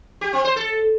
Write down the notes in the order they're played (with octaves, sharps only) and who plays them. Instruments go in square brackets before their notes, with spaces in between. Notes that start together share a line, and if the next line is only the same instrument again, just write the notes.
[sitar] G4
C4
C5
A4